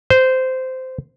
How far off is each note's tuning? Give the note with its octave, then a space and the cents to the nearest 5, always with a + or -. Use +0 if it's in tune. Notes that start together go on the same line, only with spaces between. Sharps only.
C5 -15